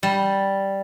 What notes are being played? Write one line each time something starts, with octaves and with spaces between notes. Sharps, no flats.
G3